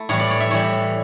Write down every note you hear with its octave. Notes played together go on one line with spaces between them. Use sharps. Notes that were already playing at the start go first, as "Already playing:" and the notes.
Already playing: A3 E4
A2 E3 G3 C#5
D5
C#5
E5
A2 E3 G3 C#5